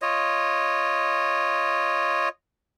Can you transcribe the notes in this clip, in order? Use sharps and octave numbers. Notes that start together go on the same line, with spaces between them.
F4 C#5 D#5